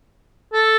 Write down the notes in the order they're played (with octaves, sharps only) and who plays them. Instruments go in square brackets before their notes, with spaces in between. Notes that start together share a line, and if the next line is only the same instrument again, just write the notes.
[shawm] A4